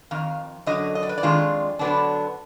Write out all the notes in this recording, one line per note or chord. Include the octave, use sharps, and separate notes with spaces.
F2 D#3 F5
F#2 D3 F#3 D#5
D#5
D5
B4
D5
F2 D#3 G#3 D4 F4
D3 F#3 B3 D4